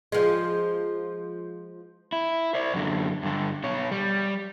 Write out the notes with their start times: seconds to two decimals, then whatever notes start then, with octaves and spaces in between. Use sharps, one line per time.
0.12 F3 G#3
2.12 E4
2.55 C5 D5
2.74 F#2 D3
3.23 G2 D3
3.63 B2 C#5
3.92 G3